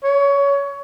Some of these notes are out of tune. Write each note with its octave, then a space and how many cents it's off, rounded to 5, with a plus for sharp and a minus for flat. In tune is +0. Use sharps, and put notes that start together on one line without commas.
C#5 +20